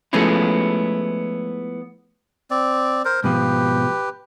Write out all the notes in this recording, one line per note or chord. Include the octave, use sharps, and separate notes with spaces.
F3 G#3 A3 B3 C#4 E4
C4 D5
A#4 C5
G#2 B2 F3 G4 B4